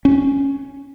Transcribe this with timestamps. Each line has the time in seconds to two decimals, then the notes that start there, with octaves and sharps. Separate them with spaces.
0.05 C#4